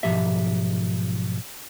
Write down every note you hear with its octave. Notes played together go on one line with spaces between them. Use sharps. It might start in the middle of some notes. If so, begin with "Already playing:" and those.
B1 G#2 C3 F3 G4 E5